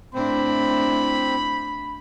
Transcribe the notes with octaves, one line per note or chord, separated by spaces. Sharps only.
A2 C4 D4 E4 B5